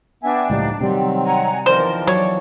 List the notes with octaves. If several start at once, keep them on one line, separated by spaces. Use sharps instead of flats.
B3 D4 E5 G5 G#5
C#2 A2 F3 G3 D#4
C3 D#3 F#3 G3 C4
F#5 G#5 A#5
E2 D#3 F3 A#4 C5 D5
F#3 C#5 D5